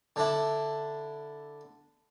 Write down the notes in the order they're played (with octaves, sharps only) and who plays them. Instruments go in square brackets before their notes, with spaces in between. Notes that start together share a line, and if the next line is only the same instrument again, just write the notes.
[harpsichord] D3 D4 E4